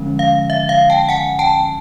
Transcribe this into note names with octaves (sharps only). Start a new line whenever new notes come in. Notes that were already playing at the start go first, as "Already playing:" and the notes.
Already playing: D3 F3 G#3 C#4
F5
E5
F5
G5 A5
F#5 G#5
G5 A5